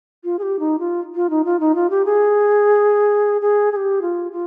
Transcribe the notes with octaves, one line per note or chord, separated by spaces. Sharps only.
F4
G#4
G4
D#4
F4
F4
D#4
F4
D#4
F4
G4
G#4
G#4
G#4
G4
F4
F4